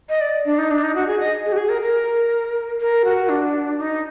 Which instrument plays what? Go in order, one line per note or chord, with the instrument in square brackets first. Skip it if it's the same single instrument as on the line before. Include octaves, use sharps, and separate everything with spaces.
[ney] D#5
D5
D4
D#4
D4
D#4
F#4
G#4
D#5
G#4
F#4
G#4
A#4
A#4
A#4
F#4
D4
D#4